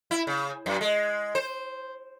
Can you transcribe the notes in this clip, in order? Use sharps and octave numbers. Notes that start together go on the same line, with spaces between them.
E4
C#3
F#2
G#3
C5